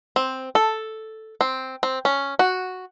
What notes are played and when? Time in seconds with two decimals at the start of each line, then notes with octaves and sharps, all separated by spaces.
0.16 C4
0.55 A4
1.41 C4
1.83 C4
2.05 C#4
2.39 F#4